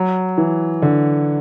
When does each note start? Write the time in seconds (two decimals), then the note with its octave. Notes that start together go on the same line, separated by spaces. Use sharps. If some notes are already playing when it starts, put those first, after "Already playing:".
Already playing: F#3
0.38 E3
0.82 D3